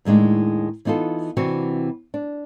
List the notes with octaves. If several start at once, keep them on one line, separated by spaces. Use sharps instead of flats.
D#2 A2 G#3 D4 D#4
E3 B3 D#4 F4 A4
C3 E3 C4 D4 F#4
D4